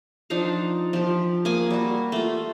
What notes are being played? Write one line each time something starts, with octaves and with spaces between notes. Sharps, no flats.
F3 D4 D#4 F5
F3 G4
A#3 G#4 G#5
G3 F#4
A3 F4